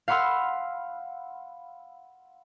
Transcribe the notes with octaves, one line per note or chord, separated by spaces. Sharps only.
F5 F#5 B5 C6 E6 F6